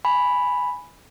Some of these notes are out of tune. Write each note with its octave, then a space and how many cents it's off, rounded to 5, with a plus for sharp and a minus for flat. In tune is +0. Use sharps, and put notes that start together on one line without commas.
G#5 +0 B5 +0